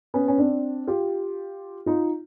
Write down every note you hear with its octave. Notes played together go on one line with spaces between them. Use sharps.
B3 C#4
C#4
C4 D4
F4 G4
D#4 F4